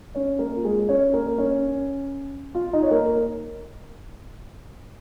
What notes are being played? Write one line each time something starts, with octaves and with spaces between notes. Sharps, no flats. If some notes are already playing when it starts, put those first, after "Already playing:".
C#4 C#5
A#3 A#4
F4
G#3 G#4
C#4 C#5
A#3 A#4
C#4 C#5
F4 F5
D#4 D#5
C#5
A#3 A#4